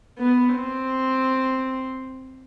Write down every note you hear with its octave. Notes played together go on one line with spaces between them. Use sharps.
B3
C4